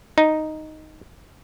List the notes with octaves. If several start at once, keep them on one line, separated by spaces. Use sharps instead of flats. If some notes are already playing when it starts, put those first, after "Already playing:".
D#4